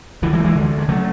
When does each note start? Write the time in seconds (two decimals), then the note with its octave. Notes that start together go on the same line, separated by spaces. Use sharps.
0.22 D2 D3 E3
0.33 E3 G#3
0.40 A3
0.44 E3 G#3
0.55 D2 D3
0.78 G#3
0.88 C#3 F#3 A3